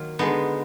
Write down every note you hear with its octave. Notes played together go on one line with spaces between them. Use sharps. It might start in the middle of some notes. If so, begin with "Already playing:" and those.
Already playing: D#3 F#3 A#3 F4
D3 G#3 B3 D#4